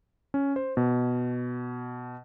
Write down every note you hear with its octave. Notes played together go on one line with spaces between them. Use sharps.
C#4
C5
B2